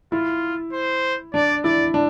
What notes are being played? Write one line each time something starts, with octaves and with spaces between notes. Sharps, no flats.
E4 F4
C5
D4 D5
E4 D5
D4